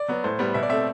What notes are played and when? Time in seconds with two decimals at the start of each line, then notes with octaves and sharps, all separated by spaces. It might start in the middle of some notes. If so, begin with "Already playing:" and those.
Already playing: D5
0.08 F#3 B3
0.24 A2 C5
0.39 G3 B3
0.54 B2 E5
0.63 D5
0.69 A3 C4 E5